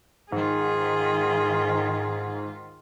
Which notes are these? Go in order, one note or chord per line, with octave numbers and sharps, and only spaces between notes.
G#2 D#3 F4 G#4